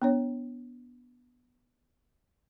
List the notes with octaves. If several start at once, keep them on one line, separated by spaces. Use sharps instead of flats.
B3 D4 C#5